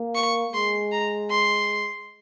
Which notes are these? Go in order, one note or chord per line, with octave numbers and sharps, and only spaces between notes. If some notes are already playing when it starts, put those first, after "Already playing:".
Already playing: A#3
C#6
G#3 C6
A#5
C6